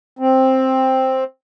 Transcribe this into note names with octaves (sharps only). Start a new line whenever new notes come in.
C4